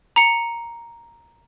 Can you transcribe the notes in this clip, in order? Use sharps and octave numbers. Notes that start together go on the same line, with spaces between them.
A#5 C#7